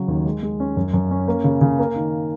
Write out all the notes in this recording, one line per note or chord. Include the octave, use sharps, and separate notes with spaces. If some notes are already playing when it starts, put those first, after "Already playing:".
Already playing: C#3 F#3
D#2
G#3
G#3
C#4
F#2
F#2
C#4
A#3
C#3
C#3
A#3
D#3